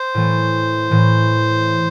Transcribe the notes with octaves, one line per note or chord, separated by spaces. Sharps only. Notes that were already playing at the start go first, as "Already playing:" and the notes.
Already playing: C5
A2 E3 A3
A2 E3